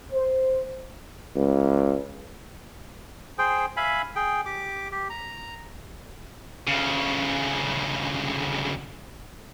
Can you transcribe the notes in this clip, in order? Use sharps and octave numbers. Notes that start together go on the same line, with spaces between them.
C5
C#2
G#4 C5 G5
E5 F5 G#5 B5
G#4 G5
G4 D6
G4
A#5
D2 C#3